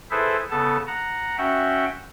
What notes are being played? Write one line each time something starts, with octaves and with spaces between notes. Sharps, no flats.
E4 G#4 A4 B4 C5 E5
C#3 B3 A4 A5
F#5 A#5
C#4 F#4 E5 F#5 G5